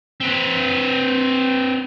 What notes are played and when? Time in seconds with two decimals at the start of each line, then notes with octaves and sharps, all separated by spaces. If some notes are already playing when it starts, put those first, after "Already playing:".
0.20 C4 B4